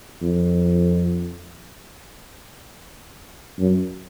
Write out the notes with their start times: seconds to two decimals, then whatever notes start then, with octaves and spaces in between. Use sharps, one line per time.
0.22 F2
3.60 F#2